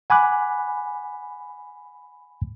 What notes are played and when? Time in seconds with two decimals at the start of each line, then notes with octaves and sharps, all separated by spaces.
0.10 F#5 G#5 B5 D6 F#6